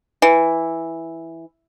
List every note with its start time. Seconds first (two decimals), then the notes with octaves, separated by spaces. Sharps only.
0.22 E3